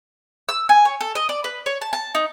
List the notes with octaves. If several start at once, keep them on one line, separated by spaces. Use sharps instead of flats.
E6
G#5
C#5
A4
D#5
D5
B4
C#5
A5
A5
D#4